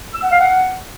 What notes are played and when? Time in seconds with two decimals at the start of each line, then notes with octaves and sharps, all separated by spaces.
0.14 E6
0.23 F#5
0.31 F5
0.40 F#5